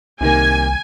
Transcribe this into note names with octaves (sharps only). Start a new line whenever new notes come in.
C2 C3 D#3 A#3 G#5